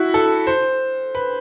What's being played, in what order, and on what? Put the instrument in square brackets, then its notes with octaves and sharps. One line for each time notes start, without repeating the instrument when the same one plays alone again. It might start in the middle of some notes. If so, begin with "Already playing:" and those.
Already playing: [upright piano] E4 F#4
A4
C5
B4